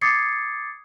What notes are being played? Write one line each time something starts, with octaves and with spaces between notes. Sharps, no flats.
D6 D#6 G#6 A6 C7 C#7